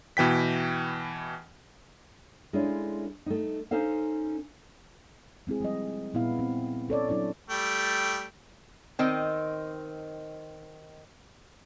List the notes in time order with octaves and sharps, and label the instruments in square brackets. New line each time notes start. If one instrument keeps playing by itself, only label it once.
[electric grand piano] B2 E3 G5 B6
[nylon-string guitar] G#3 A3 C#4 D4 E4 F4
A3 D#4
C#4 D#4 A4 C5 F5
[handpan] G#3 C4 E4 G#4
F3 G3 D#5
A#2 B3 E4 F5
C4
C#4 A4 C#5 D5
F#3 D4 E4 D5
[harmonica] G3 A3 G5
[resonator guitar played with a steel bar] D#3 C4 D#5